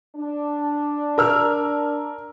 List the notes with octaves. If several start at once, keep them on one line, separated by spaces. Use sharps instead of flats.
D4
A#4 E6 F6